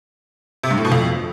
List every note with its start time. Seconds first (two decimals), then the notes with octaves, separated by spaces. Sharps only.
0.63 C3
0.71 G2
0.78 A2
0.85 B2
0.92 F2